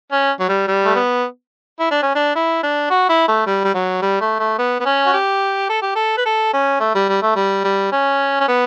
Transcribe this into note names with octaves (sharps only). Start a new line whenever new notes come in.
C#4
F#3
G3
G3
A3
B3
E4
D4
C#4
D4
E4
D4
F#4
E4
A3
G3
G3
F#3
G3
A3
A3
B3
B3
C#4
F#4
G4
A4
G4
A4
B4
A4
C#4
A3
G3
G3
A3
G3
G3
C#4
C#4
B3